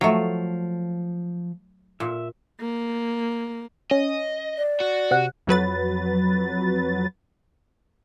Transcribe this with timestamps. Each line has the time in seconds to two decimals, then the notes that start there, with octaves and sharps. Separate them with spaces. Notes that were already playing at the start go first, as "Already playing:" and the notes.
0.01 F3 F#3 A3 F5
2.00 A#2 E5
2.60 A#3
3.91 C#4 D#5
4.57 D5
4.81 F#4
5.11 C3 F#5
5.47 F2 F#3 B4 A6